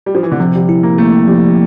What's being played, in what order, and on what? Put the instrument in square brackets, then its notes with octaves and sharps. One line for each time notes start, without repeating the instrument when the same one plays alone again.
[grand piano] G3
F3
E3
D3
[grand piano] C3 [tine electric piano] F3
[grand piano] G3
[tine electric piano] E4
[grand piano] A#3
[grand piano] A3 [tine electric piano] A#3
[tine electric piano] F3 [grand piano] G3